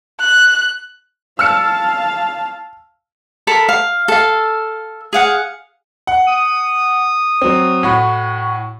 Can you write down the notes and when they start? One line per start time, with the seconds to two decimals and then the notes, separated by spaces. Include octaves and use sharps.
0.20 F#6
1.39 F5 A5 E6 F6 C#7
3.47 A4 A#4 B5
3.69 F5
4.08 A4 F5
5.13 G#4 F5 F#5
6.07 F#5
6.28 D#6
7.41 F#3 C4
7.83 A2 F#4 B5